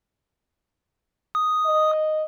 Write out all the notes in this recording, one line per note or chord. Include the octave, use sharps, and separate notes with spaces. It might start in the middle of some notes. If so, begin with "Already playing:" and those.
D#6
D#5